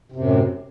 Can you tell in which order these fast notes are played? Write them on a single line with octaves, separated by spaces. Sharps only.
C3 F#2 A2